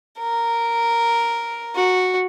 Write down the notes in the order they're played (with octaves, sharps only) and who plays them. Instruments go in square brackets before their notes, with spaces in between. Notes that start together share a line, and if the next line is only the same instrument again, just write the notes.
[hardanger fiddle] A#4
F#4